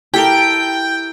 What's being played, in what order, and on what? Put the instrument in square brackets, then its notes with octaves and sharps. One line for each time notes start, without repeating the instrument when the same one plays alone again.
[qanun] E4 A4 A#4 [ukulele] G4 [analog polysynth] G5